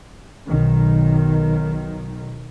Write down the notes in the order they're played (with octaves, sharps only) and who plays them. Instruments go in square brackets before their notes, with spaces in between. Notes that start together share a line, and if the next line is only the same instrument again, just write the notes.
[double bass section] B1 D#3